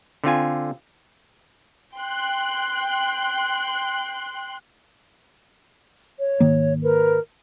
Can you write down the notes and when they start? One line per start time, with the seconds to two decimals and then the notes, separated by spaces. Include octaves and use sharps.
0.24 D3 C4 F4 G#5
1.95 G5 C6 F#6
6.18 C#5
6.40 G#2 D#3 A#3
6.83 A#4 B4